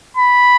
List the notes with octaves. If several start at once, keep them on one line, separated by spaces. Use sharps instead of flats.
B5